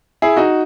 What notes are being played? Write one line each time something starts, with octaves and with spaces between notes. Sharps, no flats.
E4 G#4
D#4 F#4